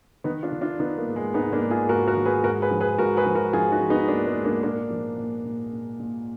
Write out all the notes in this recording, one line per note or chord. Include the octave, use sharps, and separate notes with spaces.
D#3 B3 D#4
D4 F4
D#3
D4 F4
D#3 B3 D#4
A#3
G#2
G#3
G#2 B3 D#4
A#3 D4
G#2
F4 G#4
G#2 F#4 A#4
F#4 A#4
D#3
G#4 B4
G#2 F#4 A#4
G#4 B4
F3
G#4 B4
G#2 F#4 A#4
G#4 B4
F3
F#4 A#4
F3 F4 G#4
D#4 F#4
F3
B3 D#4
G#2 A#3 D4
G#3 B3
G#2
A#3 D4
A#2 A#3 D4
F3
A#2
A#2
A#2
A#2